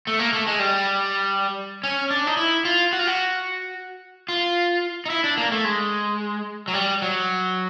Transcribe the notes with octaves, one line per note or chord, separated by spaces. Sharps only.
A3
A#3
A3
G#3
G3
C#4
D4
D#4
E4
F4
F#4
F4
F#4
F4
D#4
E4
D4
A#3
A3
G#3
F#3
G3
F#3